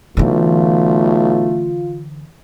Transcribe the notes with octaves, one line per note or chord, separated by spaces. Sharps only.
B1 D3 E3 A3 F4